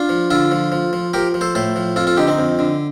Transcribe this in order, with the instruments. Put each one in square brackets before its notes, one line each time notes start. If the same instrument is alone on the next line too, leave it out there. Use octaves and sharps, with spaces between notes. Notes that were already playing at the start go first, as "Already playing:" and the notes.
Already playing: [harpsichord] D4 F4
F3
D3 F4 A4
F3
F3
F3
F3 G4 A#4
F3
A4 C5
A2 A4 C5
F3
F2 F4 A4
F4 A4
D3 D#4 G4
C4 D#4
F2
D3